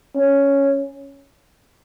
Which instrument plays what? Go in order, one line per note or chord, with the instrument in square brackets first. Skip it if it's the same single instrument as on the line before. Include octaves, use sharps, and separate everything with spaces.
[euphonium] C#4